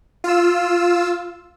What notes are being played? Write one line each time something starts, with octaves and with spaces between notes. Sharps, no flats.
F4 E6